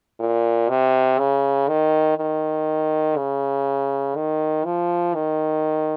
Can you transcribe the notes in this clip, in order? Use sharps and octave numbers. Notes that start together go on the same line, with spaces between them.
A#2
C3
C#3
D#3
D#3
C#3
D#3
F3
D#3